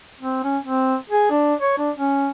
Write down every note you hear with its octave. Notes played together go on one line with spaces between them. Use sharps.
C4
C#4
C4
G#4
D4
C#5
D4
C#4